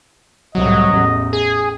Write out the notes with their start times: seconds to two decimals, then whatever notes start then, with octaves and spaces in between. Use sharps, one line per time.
0.55 C2 A2 F#3 D#5
0.92 A1 E2
1.33 G#4